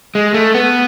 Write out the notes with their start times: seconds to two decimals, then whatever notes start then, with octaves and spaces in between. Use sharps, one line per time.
0.15 G#3
0.34 A3
0.54 B3